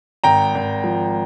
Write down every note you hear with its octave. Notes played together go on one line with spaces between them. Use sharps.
G#1 G5 A#5
G#1
F3